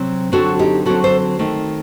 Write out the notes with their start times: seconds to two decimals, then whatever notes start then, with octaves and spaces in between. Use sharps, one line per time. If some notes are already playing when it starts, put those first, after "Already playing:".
Already playing: C3 F#3 C4
0.32 D3 F#3 C4 F#4 A4
0.59 D#4 G4
0.86 D3 F#3 C4 F#4 A4
1.04 A4 C5
1.39 D#3 A3 C4